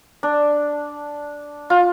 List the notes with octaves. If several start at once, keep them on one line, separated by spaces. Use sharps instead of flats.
D4
F4